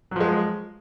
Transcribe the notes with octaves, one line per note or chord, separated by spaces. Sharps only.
F3 F#3 G#3